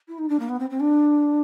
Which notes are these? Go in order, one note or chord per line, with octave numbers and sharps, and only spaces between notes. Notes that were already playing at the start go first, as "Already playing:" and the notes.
E4
D#4
D4
A#3
B3
C4
C4
D4